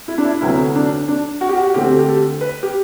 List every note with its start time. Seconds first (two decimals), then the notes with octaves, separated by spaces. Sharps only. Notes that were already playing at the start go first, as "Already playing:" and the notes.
0.08 E4
0.18 D4
0.25 E4
0.41 D2 C3 F#3 B3 E4
0.75 D4
1.08 D4
1.41 F#4
1.49 G4
1.57 F#4
1.74 D2 D3 A3 C4 G4
1.99 G4
2.09 A4
2.41 B4
2.63 G4